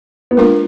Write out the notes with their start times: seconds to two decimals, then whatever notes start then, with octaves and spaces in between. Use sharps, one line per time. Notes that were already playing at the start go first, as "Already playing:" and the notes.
0.31 B3
0.37 G#3 A#3 D4 F4 A#4